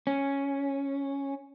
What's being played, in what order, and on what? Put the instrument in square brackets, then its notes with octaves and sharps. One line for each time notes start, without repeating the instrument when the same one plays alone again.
[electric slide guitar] C#4